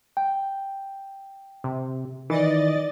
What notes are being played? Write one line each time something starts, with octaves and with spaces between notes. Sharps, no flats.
G5
C3
D#3 E3 D5 D#5 A6